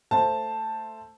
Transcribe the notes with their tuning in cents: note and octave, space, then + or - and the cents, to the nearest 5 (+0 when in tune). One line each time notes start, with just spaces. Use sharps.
A3 +10 C5 +0 A5 +0